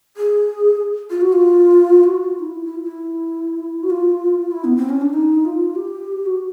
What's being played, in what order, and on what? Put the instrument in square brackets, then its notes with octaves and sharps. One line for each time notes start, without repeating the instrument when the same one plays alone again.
[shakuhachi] G#4
F4
F#4
F4
F#4
F4
D#4
E4
E4
F4
E4
F#4
F4
E4
B3
C4
C#4
D4
D#4
F4
G4
F#4